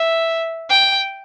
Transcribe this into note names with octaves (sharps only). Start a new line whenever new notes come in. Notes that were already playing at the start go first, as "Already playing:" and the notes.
Already playing: E5
G5